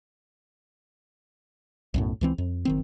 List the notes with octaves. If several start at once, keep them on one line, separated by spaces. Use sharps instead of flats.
B1 F#2 A2
C#2 E3 C4
F2
F#1 D#3 C4